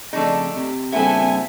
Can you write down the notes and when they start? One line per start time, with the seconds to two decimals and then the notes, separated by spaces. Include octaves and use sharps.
0.13 F2 C#3 A3 D4 D#4
0.56 C3
0.92 G2 A#2 C#3 B3 C4 A4 E5 G#5